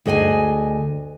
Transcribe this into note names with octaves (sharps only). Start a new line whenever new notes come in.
D2 G#4 D#5 G5 G#5